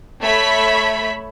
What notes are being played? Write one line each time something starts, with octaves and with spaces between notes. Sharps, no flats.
A3 C#5 E5 B5 B6